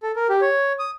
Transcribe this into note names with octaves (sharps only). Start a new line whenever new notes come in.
A4
A#4
G4
C#5
D#6